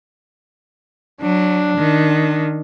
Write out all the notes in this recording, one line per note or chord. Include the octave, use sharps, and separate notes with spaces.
F#3 D4
D#3